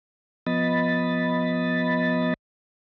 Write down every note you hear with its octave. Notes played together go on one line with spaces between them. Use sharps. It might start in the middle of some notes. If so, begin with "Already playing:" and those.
F3 B3 D#5 B5 A6